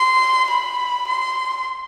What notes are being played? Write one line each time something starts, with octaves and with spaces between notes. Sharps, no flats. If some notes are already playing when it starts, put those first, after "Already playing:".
Already playing: C6
B5
C6